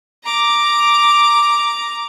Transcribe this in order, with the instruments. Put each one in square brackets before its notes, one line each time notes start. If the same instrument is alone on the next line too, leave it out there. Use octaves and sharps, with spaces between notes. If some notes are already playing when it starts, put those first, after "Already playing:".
[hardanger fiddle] A#5 D6